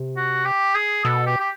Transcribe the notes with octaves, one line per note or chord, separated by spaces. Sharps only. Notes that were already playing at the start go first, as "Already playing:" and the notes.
Already playing: C3
F#4
G4
G#4
B2 A4
G4
G4